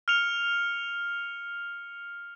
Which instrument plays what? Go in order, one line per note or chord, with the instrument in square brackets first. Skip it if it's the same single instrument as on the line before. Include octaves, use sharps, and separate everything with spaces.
[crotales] F6 C#7 F7